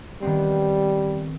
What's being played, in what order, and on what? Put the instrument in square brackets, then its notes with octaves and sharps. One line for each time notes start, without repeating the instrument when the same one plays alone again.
[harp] D#3 B3 C4 [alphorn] G3